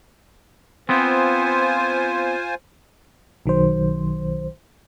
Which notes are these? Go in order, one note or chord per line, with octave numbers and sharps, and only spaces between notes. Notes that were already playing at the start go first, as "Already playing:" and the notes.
B3 C4 F4 C5 G#5
B1 D#3 F#3 C5